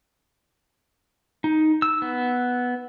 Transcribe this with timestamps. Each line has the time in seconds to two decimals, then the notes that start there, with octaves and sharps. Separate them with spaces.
1.44 D#4
1.82 E6
2.02 B3